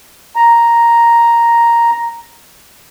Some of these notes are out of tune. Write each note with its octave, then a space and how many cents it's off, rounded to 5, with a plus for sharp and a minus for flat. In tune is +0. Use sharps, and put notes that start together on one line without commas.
A#5 +0